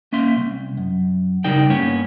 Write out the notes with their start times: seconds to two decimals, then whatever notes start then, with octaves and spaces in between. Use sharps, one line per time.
0.13 A#3 C#4 E5 C6
0.37 C2
0.77 F#2
1.44 C#3 G3 D#4 A#4 D5 G5
1.70 G2 A#3 B3 C#4 C#5